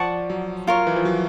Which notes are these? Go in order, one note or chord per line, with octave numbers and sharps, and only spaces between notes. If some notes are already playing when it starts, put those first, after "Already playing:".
Already playing: F3 D5 F#5 A5 C#6
F#3
F4 A#4 C#5
E3
F3
F#3